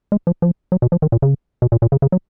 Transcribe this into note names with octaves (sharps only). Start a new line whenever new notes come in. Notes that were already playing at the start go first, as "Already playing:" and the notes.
G#3
F3
F3
F#3
B2
F3
D#3
A#2
C#3
B2
A#2
A#2
C#3
C#3
F#3